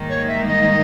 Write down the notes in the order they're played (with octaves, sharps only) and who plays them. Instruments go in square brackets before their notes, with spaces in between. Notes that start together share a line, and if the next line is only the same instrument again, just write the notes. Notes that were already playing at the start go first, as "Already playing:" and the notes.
Already playing: [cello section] G#2 D#3 G3 A#3 D#4
[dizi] C#5
E5
D#5